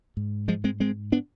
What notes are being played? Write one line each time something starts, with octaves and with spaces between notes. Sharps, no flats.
G#2
F3 G#3
G#3 C4
G#3 C4
B3 D4